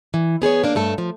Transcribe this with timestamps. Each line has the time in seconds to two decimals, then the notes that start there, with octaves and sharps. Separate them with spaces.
0.14 E3
0.42 B3 G#4 C5 C#5
0.64 A#3 D4
0.75 G2 A3 A4
0.98 F3